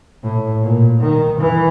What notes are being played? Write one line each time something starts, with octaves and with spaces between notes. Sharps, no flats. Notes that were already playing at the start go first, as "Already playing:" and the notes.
A2
A#2
D#3
E3